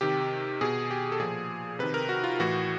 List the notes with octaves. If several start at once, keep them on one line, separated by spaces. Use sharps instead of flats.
C3 D#3 G4
B2 G#4
G4
A4
A#2 F3 G#4
C3 D#3 B4
A#4
F#4
F4
A2 E3 F#4